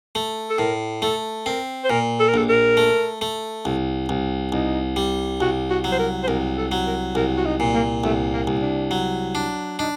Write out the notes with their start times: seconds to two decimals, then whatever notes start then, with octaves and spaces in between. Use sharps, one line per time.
0.15 A3
0.49 A4
0.59 A2 A#4
1.02 A3 A4
1.46 C4 A#4
1.84 C5
1.90 A#2 A#4
2.20 A4
2.28 A#4
2.34 A#1 A4
2.49 A#4
2.77 A3
3.21 A3
3.65 C2
4.09 C2
4.52 C2 D#4
4.96 G3
5.40 C2 F#4
5.70 F#4
5.84 F#3
5.92 C5
5.99 A#4
6.23 C5
6.28 C2 A#4
6.57 A4
6.72 F#3
6.86 A#4
7.15 C2 A#4
7.37 F#4
7.45 D#4
7.60 A#2
7.74 A#3
8.04 C2 A3
8.33 A#3
8.47 C2
8.62 D4
8.91 F#3
9.35 D4
9.79 D4 D#4